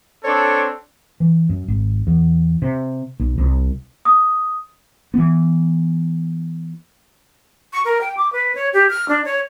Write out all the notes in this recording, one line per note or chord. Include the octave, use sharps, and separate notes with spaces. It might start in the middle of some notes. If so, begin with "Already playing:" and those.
C4 D4 A4 C#5
E3
F#2
G#1
E2
C3
B1
C2
D#6
E3 B3
C#6
A#4
G5
D6
B4
C#5
G4
F6
D4
C#5